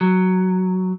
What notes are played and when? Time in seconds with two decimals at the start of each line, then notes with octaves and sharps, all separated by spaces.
0.01 F#3